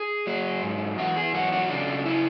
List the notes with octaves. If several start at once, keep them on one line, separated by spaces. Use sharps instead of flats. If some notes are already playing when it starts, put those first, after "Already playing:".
Already playing: G#4
F#3
G#2
E2 F#4
G#4
F#3 F#4
F#4
C#3 D4
C#3 E4